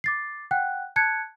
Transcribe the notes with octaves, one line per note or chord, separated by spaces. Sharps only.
D6 A6 C7
F#5 G5 F#6
A5 F#6 G#6 C#7